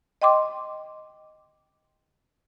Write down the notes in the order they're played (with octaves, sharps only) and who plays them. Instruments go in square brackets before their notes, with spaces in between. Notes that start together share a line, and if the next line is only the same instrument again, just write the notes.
[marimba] D#5 G5 C6 D6